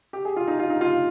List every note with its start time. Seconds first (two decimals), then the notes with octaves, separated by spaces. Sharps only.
0.13 G4
0.25 G#4
0.36 F4
0.48 D#4
0.59 F4
0.70 D#4
0.81 F4